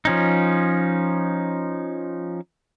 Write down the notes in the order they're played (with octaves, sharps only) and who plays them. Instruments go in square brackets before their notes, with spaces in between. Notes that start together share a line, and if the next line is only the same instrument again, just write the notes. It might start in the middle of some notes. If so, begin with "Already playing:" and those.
[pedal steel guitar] F3 C#4 D#4